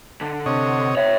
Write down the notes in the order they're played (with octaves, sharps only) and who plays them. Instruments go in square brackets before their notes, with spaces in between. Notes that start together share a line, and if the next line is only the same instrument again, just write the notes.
[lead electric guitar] D3
[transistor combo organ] C3 C#5 D#5
[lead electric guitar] C#5 E5